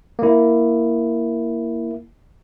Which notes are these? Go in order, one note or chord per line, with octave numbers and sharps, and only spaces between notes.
A#3 E4